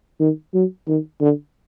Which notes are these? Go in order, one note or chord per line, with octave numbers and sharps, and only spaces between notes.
D#3
F#3
D#3
D3